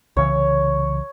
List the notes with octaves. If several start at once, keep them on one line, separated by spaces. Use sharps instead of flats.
C2 C#3 E3 C#5